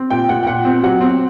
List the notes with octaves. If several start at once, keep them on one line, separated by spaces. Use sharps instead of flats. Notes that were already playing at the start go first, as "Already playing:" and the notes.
Already playing: C4
A#2 G5
A#2 F#5
G5
A#2 F#5
C4
F#3 F#5
C4